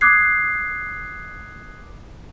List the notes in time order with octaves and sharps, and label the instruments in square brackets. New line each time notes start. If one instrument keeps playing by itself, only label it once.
[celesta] D6 D#6 F#6 G#6 C7